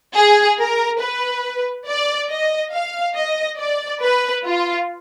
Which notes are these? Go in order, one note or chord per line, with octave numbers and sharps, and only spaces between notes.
G#4
A#4
B4
D5
D#5
F5
D#5
D5
B4
F4